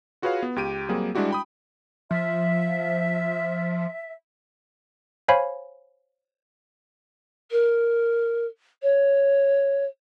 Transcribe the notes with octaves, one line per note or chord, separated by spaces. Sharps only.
F4 F#4 G#4 B4 C#5 F5
B3
C#2 G4 D7 D#7
F#3 G3 A#3 C4 G#4
G3 G#3 D4 E4 F#4 G4
G5 B5 D#6
F3 E5
C5 C#5 F5 G#5 B5
A#4
C#5